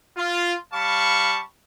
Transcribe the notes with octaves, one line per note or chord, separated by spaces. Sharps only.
F4
G3 F5 A5 B5 C#6